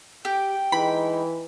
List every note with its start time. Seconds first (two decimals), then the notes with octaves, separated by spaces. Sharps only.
0.25 G4 G5
0.72 E3 G#3 D#4 B5